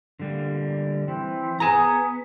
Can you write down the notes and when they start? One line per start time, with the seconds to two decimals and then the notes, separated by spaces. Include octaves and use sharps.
0.19 D3 G3 A#3
1.08 E3 C4
1.60 B3 G#4 G#5 A#5